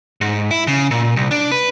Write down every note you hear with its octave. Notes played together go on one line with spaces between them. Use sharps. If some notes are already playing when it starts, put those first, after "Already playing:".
G#2
E4
C#3
A#2
C2
D4
B4